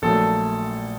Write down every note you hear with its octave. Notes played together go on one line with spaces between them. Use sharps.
A#1 A#2 F#3 A3 A4